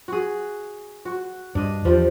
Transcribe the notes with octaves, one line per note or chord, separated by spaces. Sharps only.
F#4 G#4
F#4
G2 D4 D#5
E2 F3 G3